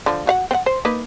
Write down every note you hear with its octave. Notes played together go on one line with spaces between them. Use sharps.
D3 F3
F#4 F5 F#5
C4 F#5
C5
A#3 D#4 B4